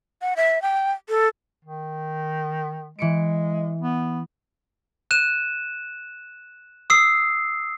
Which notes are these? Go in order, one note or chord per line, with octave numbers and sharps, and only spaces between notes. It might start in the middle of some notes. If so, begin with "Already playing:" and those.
F#5
E5
G5
A4
D#3
E3 G#3 C#7 D7
B3
F#6 D#7 E7
D#6 E6 C7